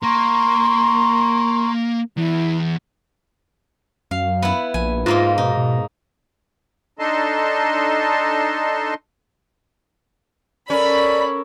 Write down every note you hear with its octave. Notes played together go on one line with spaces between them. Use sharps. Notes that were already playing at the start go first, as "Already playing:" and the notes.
A#3 A#5 C6 C#6
E2 E4
F#2 F5
B3 E4
A#1 G#5
G#2 A#3 D#4 F4
B2 D#4
B2
D4 D#4 A4 D#5 A5 C6
C#4 A4 A#4 D5 B5